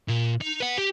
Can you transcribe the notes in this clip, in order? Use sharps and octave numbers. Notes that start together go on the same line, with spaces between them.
A#2
D#4
B4 F#5
G4